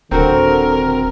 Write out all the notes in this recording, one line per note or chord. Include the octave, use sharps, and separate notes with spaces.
D#1 D3 C4 F#4 A#4